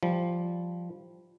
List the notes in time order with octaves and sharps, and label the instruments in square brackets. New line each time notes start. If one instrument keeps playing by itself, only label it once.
[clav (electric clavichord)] F3 G3